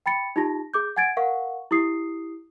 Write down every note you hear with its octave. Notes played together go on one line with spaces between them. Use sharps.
G5 B5 A6 C#7
D#4 F4 G4 A5 A#6
G#4 D6 G6
F#5 G#5 G#6 A6 D7
A#4 F5 F#5 C#6
E4 G4 D#6 C7